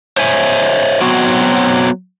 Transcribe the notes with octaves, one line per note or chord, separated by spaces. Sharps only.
C5 C#5 E5 G#5
F#3 B3 C4 F#4